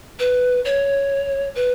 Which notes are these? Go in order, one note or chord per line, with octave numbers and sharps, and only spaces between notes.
B4
C#5
B4